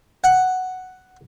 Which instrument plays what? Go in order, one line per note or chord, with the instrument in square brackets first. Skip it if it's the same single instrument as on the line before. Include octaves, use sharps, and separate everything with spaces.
[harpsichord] F#5